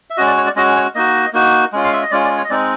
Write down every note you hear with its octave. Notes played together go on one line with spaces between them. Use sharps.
E5
G#3 C#4 F#4 D#5
D5
C#5
D5
G#3 C#4 F#4 D#5
C#5
A#3 D#4 F#4 D#5
A#3 D#4 F#4
G#3 C#4 F4
F5
E5
D#5
G#3 C#4 F4 D5
D5
C#5
D#5
G#3 C4 D#4 D5